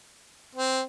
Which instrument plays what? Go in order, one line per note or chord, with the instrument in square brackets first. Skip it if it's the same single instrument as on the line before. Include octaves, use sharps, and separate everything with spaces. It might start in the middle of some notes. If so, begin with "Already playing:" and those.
[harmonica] C4